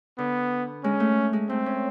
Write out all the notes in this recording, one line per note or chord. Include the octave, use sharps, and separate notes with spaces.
D3 B3
G#3 C#4
A3
G#3
A3 C4
C#4